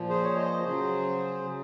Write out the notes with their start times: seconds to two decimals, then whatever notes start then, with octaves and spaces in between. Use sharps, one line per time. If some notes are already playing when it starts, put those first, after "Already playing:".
Already playing: A#2 F3
0.09 G#4 C5
0.24 C#5
0.36 C5 D#5
0.62 C#3 F#3 G#4 C5
1.42 C#3 F#3